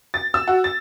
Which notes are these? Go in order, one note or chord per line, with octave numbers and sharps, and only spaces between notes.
A6
E6
F#4
A6